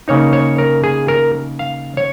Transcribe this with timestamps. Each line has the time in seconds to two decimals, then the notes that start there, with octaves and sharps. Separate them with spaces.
0.08 C#3 A#3 D#4 C#5
0.33 C#5
0.58 A#4
0.84 G#4
1.08 A#4
1.59 F5
1.97 C#5